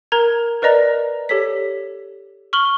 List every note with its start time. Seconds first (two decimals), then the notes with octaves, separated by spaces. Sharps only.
0.12 A#4 A#5 G#6
0.62 A#4 B4 D5 D#5 A#5
1.29 G4 A4 C#5 B6
2.53 C#6 F6 F#7 G7